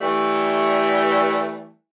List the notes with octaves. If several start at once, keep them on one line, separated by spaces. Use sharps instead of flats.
E3 G3 A3